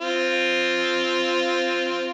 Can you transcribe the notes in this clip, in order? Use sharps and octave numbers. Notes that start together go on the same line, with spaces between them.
C4 F4